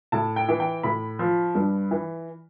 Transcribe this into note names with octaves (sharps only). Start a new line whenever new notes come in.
A2 A5
G5
E3
G5
A2 B5
F3
G2
E3